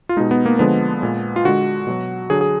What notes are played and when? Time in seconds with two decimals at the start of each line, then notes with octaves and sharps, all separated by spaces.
0.09 F4
0.17 B2 G#3 D#4
0.31 B3
0.46 A#3
0.59 D3 F3 G#3 B3
1.02 A#2 G#3
1.36 F4
1.45 D3 G#3 F#4
1.87 B2 F#3
2.30 D3 F#3 G#4
2.41 G#4